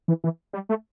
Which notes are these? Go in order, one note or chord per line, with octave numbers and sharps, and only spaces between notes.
E3
E3
G3
A3